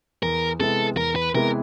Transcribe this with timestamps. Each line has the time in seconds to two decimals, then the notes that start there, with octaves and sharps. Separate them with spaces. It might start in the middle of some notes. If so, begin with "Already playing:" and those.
0.23 E2 A#4
0.59 C3 E3 G#3 B3 A4
0.97 E2 A#4
1.16 B4
1.34 C3 E3 G#3 B3 A#4